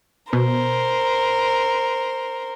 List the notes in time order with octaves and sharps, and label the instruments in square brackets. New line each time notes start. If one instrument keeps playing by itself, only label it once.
[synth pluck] B2 [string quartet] A#4 C5